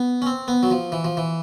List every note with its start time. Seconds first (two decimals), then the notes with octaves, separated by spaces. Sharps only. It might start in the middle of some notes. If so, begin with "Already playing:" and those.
Already playing: B3
0.22 C#4
0.26 C4
0.48 B3
0.63 F#3
0.71 F3
0.92 E3
1.05 F3
1.17 E3